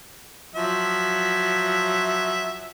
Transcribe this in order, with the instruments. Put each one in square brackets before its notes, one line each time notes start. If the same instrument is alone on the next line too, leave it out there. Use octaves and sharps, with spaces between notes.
[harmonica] F3 F#3 E5